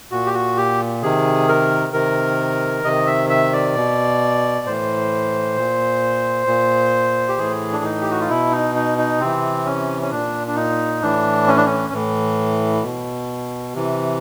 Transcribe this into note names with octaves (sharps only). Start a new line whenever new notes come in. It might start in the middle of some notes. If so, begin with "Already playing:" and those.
A#2 F#4
G4
F#4
G4
C3 D#3 G#4
A#4
C3 D#3 A#4
C3 D#3 D#5
E5
E5
D5
B2
A2 E3 C5
A#2
A#2
G4
A2 E3 G#4
D4
D#4
G4
F#4
F4
B2 E4
D#4
D#4
D#4
C3 E3 C4
C#4
C#4
A#2 D4
D4
D#4
A2 E3 D4
C#4
D4
C#4
A2 E3
B2
C3 E3